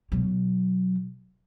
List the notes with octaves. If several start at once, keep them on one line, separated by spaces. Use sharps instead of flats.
B2 F#3